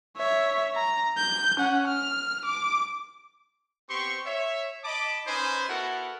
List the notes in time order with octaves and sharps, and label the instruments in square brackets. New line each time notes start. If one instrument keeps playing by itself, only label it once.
[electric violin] C#5 E5
A#5
G6
C#4 F#5
F6
D6
[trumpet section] B3 C4 G4 C6 C#6
C#5 E5
D#5 A5 B5 D6
C#4 D#4 B4 C5 G#5 B5
B3 E4 F#4 A4 A#4 F#5